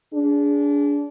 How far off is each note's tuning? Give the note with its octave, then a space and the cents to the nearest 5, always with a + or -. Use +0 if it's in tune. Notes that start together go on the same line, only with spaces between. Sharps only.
D4 -25 G#4 +0